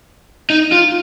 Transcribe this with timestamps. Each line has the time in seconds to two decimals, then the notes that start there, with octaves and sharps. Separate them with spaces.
0.50 D#4
0.72 F4